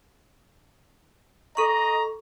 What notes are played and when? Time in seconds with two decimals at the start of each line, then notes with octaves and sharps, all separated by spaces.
1.57 A4 D#5 A#5 C#6